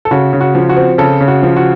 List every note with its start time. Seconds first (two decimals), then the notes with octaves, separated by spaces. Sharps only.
0.05 A4
0.11 C#3 F#4
0.33 C#3
0.41 F#4
0.55 F3
0.69 F#4
0.76 C4
0.98 C#3 A4
1.21 C#3
1.28 F#4
1.43 F3
1.57 F#4